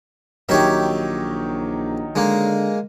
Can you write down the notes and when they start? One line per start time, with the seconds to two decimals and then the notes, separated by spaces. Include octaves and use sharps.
0.49 A#1 D#3 F#3 D#4 G4 C#5 E5
2.16 D3 G#3 A#3